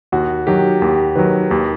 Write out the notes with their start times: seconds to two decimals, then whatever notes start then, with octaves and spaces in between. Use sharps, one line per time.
0.12 D#2 F#4
0.47 D#3 F#3 G4
0.82 D#2 G4
1.16 D#3 F#3 B4
1.50 D#2 G4